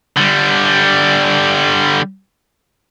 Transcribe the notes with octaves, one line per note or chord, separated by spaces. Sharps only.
D3 G3